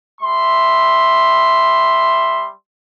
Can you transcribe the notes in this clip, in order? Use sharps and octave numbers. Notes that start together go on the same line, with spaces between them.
G3 E5 C6